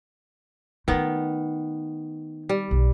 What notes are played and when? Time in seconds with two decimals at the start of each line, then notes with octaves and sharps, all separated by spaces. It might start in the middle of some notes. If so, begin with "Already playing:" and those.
0.88 D#3 A3 B3 F4
2.49 G3
2.71 B1